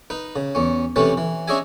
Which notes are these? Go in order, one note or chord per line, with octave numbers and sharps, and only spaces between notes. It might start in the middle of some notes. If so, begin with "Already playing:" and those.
D#4 B4
C#3
E2 C#4
C3 E3 A3 C#4 B4
E3
C#4 D4 G#4 D#5 E5 G#5